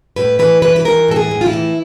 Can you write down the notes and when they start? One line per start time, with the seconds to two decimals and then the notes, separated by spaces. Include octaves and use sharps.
0.16 A2 B4
0.39 E3 B4
0.62 E3 B4
0.76 B4
0.85 E3 A#4
1.08 A2 A4
1.16 G#4
1.31 A2
1.41 F4
1.46 E4
1.53 E3